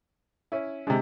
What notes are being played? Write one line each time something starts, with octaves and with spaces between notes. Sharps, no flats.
C#4 E4
C3 G#3 D4